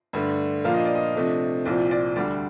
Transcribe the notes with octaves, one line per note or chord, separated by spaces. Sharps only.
G2 D3 A3
A#2 F3 A#3 D4 F5
D#5
D5
D#5
C3 F3 A3 D4
C2 A#2 F3 C4 D5
D5
D2 D3 G3 D4 D5